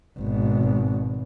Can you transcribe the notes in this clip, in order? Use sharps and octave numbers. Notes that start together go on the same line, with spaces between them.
G#1 B2